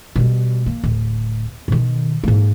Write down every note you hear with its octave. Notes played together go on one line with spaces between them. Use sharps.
B2 G3
A#3
D1
B2 D#3
G#2 A#3